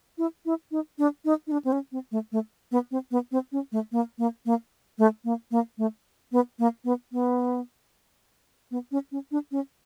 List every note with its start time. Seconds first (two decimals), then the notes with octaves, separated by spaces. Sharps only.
0.18 E4
0.46 E4
0.71 D#4
0.98 D4
1.25 D#4
1.47 D#4
1.52 D4
1.65 C4
1.72 C#4
1.92 C4
2.12 A3
2.32 A3
2.72 B3
2.91 C4
3.11 B3
3.32 C4
3.52 C#4
3.72 A3
3.92 A#3
4.18 A#3
4.46 A#3
4.98 A3
5.24 A#3
5.51 A#3
5.78 A3
6.32 B3
6.59 A#3
6.84 B3
7.12 B3
8.71 B3
8.92 C#4
9.12 C#4
9.31 D4
9.51 C#4